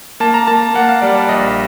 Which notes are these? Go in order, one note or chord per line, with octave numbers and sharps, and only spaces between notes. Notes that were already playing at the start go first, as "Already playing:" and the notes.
A#3 A5
A#5
A#3 A5
A#3 F#5
F5
G3 D5
D5
A#1 D#5